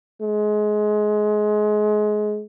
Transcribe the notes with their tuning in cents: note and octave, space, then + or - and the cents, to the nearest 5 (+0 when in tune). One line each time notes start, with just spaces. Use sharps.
G#3 +25